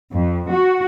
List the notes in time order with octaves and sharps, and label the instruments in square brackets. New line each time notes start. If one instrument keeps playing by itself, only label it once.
[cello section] F2
F#4